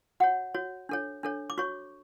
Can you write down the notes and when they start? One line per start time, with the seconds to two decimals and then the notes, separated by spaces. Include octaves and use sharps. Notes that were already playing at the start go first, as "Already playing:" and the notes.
0.20 F#4 C#5 F#5
0.54 F#4 C#5
0.89 D4 A4 C#5
1.23 D4 A4 C#5
1.50 D6
1.58 F#4 C#5 C#6